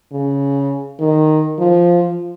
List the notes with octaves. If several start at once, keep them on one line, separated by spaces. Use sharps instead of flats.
C#3
D#3
F3